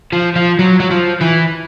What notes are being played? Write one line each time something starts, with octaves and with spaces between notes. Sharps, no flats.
F3
F3
F#3
F#3
F3
E3